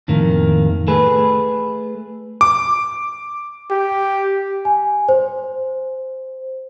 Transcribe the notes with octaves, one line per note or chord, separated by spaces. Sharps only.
F2 A2 D#3 A#3
A3 G#4 B4
D6
G4
G#5
C5